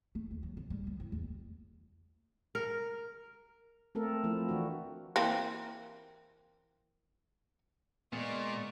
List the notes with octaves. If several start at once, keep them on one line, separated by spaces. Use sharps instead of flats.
A3
D#2
F#3
F2
G3
F3
E4
E2
A#4
A3 C4 A4 A#4
F3 A3 C4 E4
E3 D4 F#4
E3 A#3 C4
A#2 G#3 B3 D5 D#5 C#6